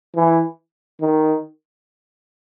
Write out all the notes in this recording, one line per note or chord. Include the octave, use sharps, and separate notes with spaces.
E3
D#3